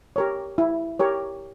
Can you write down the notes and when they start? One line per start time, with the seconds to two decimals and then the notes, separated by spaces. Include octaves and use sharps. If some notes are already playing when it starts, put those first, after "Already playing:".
0.16 G4 A#4 C#5
0.58 E4
0.99 G4 A#4 C#5